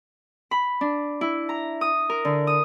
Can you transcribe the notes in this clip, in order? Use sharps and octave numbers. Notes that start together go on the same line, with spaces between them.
B5
D4
E4
A#5
D#6
A#4
D3
D#6